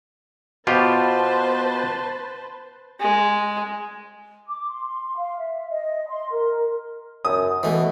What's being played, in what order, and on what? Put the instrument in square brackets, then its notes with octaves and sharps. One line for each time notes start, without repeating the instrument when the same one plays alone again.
[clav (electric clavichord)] B2 F4 G4 [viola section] B4 C5 A5
[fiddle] G#3
[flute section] D6
C6
F5
E5
D#5
C6
A#4
[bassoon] F#2 [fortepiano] D#6
[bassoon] B2 [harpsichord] E3 A3